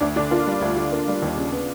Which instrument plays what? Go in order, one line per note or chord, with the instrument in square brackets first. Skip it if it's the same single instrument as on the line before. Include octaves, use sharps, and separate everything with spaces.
[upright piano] D2 [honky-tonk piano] D4
[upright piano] D3 [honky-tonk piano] D4
[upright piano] A#3 [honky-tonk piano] F4
[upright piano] G3
D2
D3
A#3
G3
D#2
C#3
B3